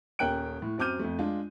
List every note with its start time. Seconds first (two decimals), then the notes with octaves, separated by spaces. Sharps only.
0.19 D#1 C#4 A#4 G5 F#6 D7
0.62 A2
0.78 F#2 C4 D6 F6 G6 D#7
0.99 F2 A3
1.19 G#3 D4 F4